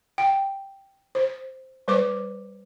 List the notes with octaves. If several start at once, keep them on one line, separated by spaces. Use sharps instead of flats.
G5
C5
G3 B4 C5 D6